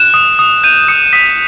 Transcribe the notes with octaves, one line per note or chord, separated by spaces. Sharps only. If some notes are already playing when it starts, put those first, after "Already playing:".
Already playing: F#6 E7
D#6
D#6
G6 D#7
D#6 C#7
D#6 B6